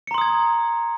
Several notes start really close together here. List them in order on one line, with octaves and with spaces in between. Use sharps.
C#7 A#5 C6 D#6 G#6